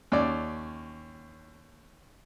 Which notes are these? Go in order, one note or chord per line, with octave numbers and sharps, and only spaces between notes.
D#2 C#4 D5